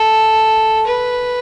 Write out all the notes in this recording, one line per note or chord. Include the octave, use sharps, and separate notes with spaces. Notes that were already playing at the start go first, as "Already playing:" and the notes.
Already playing: A4
B4